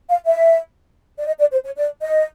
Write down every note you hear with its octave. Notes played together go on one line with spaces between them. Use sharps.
F5
E5
D5
D#5
D5
C5
C#5
D5
D#5